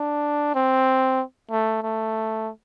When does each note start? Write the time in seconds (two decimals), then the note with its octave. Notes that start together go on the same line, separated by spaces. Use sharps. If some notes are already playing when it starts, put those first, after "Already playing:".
Already playing: D4
0.55 C4
1.51 A3
1.83 A3